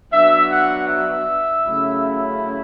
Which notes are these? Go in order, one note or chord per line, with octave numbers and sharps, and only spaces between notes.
F#3 B3 D4 E5
F#5
E5
C#3 F#3 A3 C#4 E4